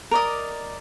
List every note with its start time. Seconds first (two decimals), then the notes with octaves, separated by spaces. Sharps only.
0.11 A#4 D5 D#5